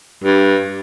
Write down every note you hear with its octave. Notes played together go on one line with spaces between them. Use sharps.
G2